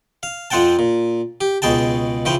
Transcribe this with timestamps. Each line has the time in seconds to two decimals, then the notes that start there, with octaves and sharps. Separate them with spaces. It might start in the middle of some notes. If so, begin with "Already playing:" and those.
0.23 F5
0.50 F2 F3 C4 F#5 G5 A5
0.79 A#2
1.41 G4
1.62 C#2 B2 G#4 G5 A5
2.25 C#3 E3 F3 G5